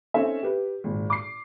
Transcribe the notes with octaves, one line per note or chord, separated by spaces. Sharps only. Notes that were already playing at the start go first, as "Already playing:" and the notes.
C4 C#4 D#4 A4 E5
G4 B4
G#1 A#2
D6 C7